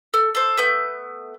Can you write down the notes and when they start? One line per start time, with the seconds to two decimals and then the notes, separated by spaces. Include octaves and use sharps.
0.14 A4
0.35 A4 C5
0.57 A3 B3 G6